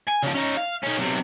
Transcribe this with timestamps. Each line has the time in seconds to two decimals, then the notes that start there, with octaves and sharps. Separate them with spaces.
0.08 G#5
0.23 C#3 F3
0.35 C#4 D#4
0.58 F5
0.84 D#3 C#4
0.98 B1 C3